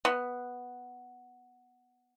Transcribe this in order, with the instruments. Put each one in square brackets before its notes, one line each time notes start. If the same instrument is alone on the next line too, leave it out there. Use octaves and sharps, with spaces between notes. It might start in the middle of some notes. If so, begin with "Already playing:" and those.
[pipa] B3